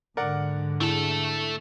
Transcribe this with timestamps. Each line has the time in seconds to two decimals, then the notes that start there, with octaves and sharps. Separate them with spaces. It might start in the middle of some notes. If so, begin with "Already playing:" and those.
0.17 G#2 D3 A#4 D5 F#5
0.81 A3 D4 E4 G#4 A4